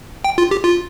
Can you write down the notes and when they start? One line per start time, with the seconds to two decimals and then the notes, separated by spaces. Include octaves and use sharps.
0.24 G5
0.38 F4
0.51 G4
0.64 F4